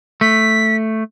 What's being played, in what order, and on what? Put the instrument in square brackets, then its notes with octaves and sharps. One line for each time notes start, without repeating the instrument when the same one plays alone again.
[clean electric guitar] A3 [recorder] B6